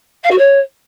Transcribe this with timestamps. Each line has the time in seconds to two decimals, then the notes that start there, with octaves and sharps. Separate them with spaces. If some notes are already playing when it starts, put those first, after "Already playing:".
0.23 F5
0.30 F#4
0.37 C#5